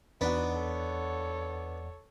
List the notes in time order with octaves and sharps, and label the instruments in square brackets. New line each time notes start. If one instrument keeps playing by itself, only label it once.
[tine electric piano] E2 D5 F#5 [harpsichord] B3 D4 B4 [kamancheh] D#4 F#4
[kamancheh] A4 C#5